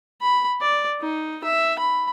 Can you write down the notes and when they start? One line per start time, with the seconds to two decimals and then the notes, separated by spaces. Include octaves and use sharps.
0.22 B5
0.61 D5
1.01 D#4
1.44 E5
1.79 B5